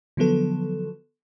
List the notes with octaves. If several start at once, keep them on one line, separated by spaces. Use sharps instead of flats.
D3 F3 F#3 B3 A4